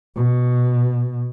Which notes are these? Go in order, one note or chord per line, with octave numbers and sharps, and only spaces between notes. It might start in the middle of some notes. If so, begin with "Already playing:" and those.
B2